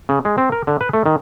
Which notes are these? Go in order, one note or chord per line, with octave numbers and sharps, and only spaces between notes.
C#3
G#3
C4
A#4
D3
B4
A3
D#3